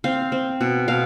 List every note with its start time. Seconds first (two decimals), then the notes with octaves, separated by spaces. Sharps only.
0.04 C4 F5
0.32 C4
0.61 B2
0.88 B2 F5